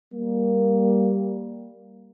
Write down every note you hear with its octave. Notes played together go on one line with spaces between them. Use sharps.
G3 A#3